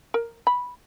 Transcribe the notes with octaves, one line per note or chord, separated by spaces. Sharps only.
A#4
B5